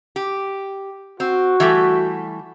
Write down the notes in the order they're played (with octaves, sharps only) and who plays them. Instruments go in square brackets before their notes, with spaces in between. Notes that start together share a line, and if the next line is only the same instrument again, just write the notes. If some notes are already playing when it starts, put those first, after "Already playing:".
[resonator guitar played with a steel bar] G4
[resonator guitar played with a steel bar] C4 [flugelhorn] F#4
[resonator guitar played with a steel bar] E3 G3 A3